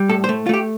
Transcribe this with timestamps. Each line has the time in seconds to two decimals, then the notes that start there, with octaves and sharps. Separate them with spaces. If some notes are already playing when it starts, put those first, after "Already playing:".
Already playing: G3
0.09 A2 A4
0.24 C5
0.29 A3
0.46 F4
0.49 A3 G4